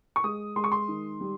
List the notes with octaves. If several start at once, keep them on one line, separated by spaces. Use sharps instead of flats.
C#6
G#3 D#6
G#3 C6
C#6
C6
D#3
G3